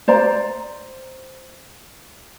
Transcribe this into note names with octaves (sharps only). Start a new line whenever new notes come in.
C5 D5 A#5